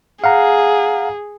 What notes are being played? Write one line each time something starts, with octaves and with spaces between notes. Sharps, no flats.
G#4 F5 F#5 A#5